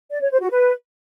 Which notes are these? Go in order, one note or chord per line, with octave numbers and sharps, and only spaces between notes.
D5
C#5
C5
F#4
B4